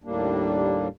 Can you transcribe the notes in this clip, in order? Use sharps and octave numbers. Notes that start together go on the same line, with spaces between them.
D#2 A2 G3 A#3 D4